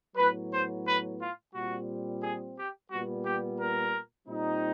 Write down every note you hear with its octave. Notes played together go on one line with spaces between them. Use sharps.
A2 F#3 B3 B4
C5
B4
F4
A#2 G3 C4 F#4
G#4
G4
A#2 G3 B3 F#4
G4
A#4
A#2 G3 C4 D#4